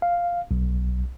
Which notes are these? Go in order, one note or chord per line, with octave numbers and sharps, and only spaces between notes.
F5
B1